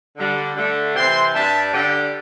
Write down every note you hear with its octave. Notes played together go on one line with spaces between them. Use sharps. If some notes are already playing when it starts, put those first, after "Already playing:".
D3 G3 D4
D3 A3 D4
C3 E3 C4 G5 C6
G2 G3 D4 E5 A5
D3 G3 D4 D5 G5